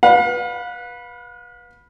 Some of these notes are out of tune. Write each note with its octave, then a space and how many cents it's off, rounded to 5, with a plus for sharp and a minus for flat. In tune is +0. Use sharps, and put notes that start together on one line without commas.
B4 -15 F5 +35